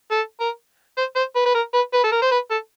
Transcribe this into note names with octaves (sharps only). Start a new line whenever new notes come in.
A4
A#4
C5
C5
B4
B4
A#4
B4
B4
A4
A#4
C5
B4
A4